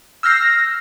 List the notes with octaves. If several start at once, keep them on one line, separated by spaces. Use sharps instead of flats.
E6 F6 G6 A#6 C7